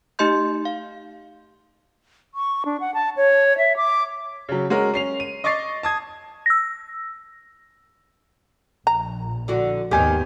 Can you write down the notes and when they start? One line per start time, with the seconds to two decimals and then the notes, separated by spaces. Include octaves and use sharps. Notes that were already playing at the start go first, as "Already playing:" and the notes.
0.19 A3 D#4 G4 D#5 C6 G6
0.65 F5
2.34 C#6
2.65 D4
2.80 F#5
2.94 A5
3.17 C#5
3.58 E5
3.77 D6
4.49 C#3 F#3
4.70 G#3 C#4 F#4 A#4
4.94 C#4 C7 F7
5.20 D#7
5.44 D#5 C#6 D6 A6 C7
5.83 A5 D#6 G#6
6.46 E6 A#6
8.87 A#1 A#5
9.48 D3 F#4
9.91 D#2 G#2 D#3 B3 G4 G#5 G6